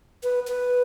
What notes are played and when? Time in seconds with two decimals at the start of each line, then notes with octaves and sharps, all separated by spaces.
0.23 B4
0.47 B4